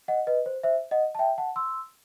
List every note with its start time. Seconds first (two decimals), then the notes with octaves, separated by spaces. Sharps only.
0.08 D#5 F#5
0.27 B4 D#5
0.46 C5
0.63 C5 E5
0.91 D#5 F#5
1.15 A5
1.19 E5 G5
1.38 F#5 A5
1.56 C6 E6